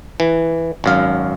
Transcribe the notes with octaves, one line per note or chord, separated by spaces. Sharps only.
E3
G#1 F#2 F5